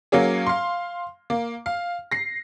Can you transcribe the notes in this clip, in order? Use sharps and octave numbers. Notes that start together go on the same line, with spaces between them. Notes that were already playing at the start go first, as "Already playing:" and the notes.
F#3 A#3 C#4 G#4
F5 C6
A#3
F5
A#6 C7